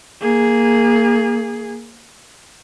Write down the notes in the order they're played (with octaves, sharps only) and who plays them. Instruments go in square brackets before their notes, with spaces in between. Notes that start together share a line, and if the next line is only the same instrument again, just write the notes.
[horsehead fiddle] A#3 G#4